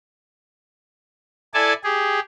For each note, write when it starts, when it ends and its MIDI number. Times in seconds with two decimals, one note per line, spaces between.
1.54 1.73 64
1.54 1.73 69
1.54 1.73 74
1.54 1.73 80
1.54 1.73 81
1.84 2.20 67
1.84 2.20 68